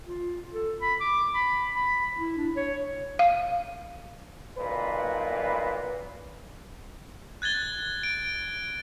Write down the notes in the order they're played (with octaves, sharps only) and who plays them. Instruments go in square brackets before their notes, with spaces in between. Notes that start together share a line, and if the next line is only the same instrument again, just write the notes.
[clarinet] F4
A4
B5
D6
B5
B5
E4
D4
C#5
[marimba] F5
[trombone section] B1 A#2 B4
[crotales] F#6 G#6 A6 G7
D7